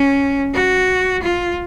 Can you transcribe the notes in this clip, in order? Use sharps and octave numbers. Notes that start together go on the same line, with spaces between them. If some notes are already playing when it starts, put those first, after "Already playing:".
Already playing: C#4
F#4
F4